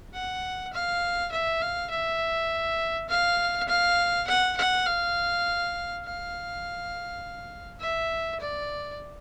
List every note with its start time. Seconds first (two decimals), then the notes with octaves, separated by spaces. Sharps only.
0.13 F#5
0.73 F5
1.32 E5
1.61 F5
1.91 E5
3.09 F5
3.68 F5
4.27 F#5
4.57 F#5
4.86 F5
6.04 F5
7.80 E5
8.40 D5